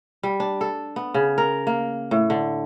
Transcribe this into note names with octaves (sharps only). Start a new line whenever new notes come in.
G3
D4
A4
B3
C#3
A#4
A#3
A2
D3